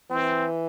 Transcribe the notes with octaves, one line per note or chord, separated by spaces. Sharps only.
E3 C4